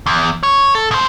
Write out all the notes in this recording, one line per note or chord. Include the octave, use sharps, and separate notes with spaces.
E2
C#5
A4
B2 C5